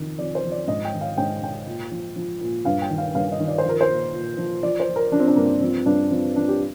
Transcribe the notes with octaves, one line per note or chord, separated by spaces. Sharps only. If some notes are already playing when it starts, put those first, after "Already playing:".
Already playing: F2 D#3
F2 D5
C5
F2
D5
G#2 D#5
G5
D#3
F5
G#2 G5
G#2 G5
A#2
F3
F3
A#2
G2 F5
G5
D#3
F5
G2 F5
D#5
D#3
D5
C5
F3
A#4
C5
A#2
A#2
F3
F3 D5
C5
F3
A#4
F3 D4
C4
D4
G2 A#3
F3 C4
G2 D4
F3 C4
F3 D4
G4